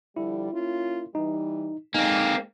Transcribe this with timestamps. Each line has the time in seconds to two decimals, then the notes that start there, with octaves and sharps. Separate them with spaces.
0.17 D3 F3 G3 E4
0.53 A#3 C#4 F4
1.15 E3 G3 D#4
1.94 G#3 A#3 C4 D#4 G#5